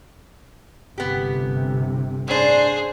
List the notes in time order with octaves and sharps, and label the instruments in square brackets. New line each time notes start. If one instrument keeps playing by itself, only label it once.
[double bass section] G1 C3 [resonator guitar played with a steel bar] B3 G4
[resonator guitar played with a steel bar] A2 D4 [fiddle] G#4 C5